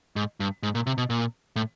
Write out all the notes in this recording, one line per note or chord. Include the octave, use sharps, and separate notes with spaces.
G#2
G2
G#2
A#2
C3
B2
A#2
A2